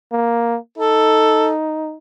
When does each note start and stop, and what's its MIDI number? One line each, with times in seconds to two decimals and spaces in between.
0.12 0.58 58
0.78 1.96 63
0.78 1.51 69